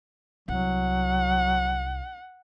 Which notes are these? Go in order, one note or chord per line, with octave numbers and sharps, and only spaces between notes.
C2 F#3 F#5